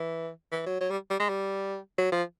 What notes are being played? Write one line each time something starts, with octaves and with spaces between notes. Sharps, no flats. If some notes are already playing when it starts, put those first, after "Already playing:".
Already playing: E3
E3
F#3
F#3
G3
G3
G#3
G3
F#3
F3